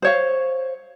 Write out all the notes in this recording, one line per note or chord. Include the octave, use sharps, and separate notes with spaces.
C5 C#5 F5